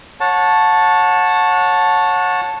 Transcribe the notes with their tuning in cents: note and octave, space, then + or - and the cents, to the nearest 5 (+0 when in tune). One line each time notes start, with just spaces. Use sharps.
C#5 -10 F#5 -30 A5 +0